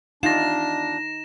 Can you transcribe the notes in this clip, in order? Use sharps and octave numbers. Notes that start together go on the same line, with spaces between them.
E2 D4 D#4 F4 G4 A#6 E7